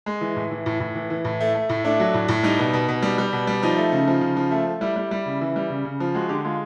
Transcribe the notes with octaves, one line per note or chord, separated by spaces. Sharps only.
G#3
E3
A2
E3
A2
A2
E3
E3
A2
A3
A3
A2
A3 D4
F#3
A2
A2
G3 D#4
B2
B2
B2
G3
G3
B2
G3
F3 D#4
A3
C#3
F3
C#3
F3
A3
A3
G3 E4
G3
G3
C#3
E3
G3
C#3
C#3
F3
G#3 F#4
D3 G4
G#3 F4